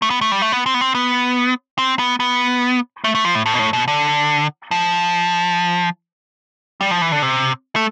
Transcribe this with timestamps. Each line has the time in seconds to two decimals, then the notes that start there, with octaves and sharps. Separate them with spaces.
0.02 A3
0.10 B3
0.21 A3
0.32 G3
0.42 A3
0.52 B3
0.66 C4
0.74 B3
0.81 C4
0.95 B3
1.78 C4
1.99 B3
2.20 B3
3.04 A3
3.15 A3
3.25 F3
3.35 A2
3.46 A2
3.54 B2
3.59 A2
3.73 B2
3.88 D3
4.71 F3
6.81 G3
6.91 F3
7.01 E3
7.12 D3
7.22 C3
7.76 A3